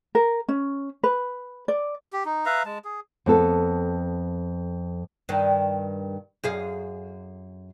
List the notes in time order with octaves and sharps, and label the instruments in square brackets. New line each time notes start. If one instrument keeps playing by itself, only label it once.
[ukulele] A#4
C#4
B4
D5
[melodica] G4
D#4
B4 E5 F5 A#5
G#3 A5
G#4
[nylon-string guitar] F2 B3 A4
[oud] G2 D#3
F#2 G#4 F5